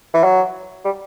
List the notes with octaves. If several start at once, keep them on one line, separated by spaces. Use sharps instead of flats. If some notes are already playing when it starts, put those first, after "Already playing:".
E3
F#3
G3